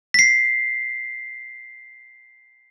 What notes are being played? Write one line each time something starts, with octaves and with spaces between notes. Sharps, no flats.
B6 C7